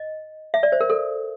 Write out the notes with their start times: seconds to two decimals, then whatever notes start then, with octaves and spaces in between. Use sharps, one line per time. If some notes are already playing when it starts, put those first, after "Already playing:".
Already playing: D#5
0.54 E5
0.63 D5
0.72 C5
0.81 A#4
0.90 A4